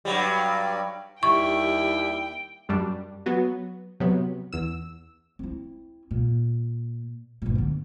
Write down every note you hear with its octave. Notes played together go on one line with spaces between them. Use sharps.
G2 F#3 G3
D#2 G3 E4 G5 C#6
F#2 G3 D4
F#3 B3 F#4
C3 F#3 B3
E2 E6
C4 E4
A#2
G1 A#2
D3 B3